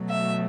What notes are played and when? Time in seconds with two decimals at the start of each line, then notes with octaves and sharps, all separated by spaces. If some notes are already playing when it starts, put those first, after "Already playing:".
Already playing: B2 F#3 A3
0.09 E5